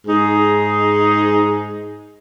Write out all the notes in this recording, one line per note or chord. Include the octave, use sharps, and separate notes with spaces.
G#2 D#4 G#4